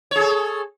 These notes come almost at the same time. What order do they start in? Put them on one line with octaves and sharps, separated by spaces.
C#5 G#4 A4